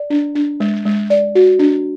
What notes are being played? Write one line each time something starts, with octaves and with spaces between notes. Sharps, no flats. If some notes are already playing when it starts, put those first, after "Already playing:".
Already playing: D5
D4
D4
G#3
G#3
D5
F#4
D4